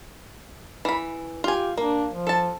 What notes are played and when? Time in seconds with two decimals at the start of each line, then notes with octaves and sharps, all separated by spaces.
0.85 E3 B5
1.44 F4 G4 G#5
1.77 A#3 D4
2.12 F3
2.27 A4 A5